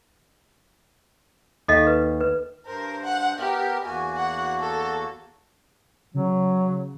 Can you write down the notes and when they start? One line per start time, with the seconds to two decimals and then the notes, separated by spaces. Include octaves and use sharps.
1.68 D#2 A4 D#5 F5
1.87 B4
2.20 B4
2.66 G2 A#4 C5
3.04 F#5
3.39 B3 G4 A#4
3.84 E2 A#3 F#4 G#5
4.17 F#5
4.60 A4
6.14 C#3 F#3